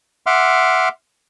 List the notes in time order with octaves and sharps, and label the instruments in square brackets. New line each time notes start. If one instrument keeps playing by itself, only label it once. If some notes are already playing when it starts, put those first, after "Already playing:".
[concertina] E5 F#5 C6 D6 F6